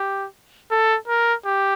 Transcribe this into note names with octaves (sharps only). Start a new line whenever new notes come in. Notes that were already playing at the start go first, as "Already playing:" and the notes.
Already playing: G4
A4
A#4
G4